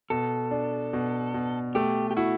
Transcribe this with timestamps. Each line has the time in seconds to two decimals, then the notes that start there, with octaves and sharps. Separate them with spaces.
0.10 B2 A4
0.51 D4
0.93 B2
1.34 B2
1.75 A3 G4
2.11 G4
2.17 E4 F#4